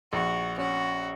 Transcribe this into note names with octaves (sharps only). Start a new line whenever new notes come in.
A#1 F#4
C#4 F#4